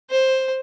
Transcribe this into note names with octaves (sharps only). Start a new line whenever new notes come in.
C5